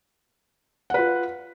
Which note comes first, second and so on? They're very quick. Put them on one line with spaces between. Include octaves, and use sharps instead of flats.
F#5 B4 F4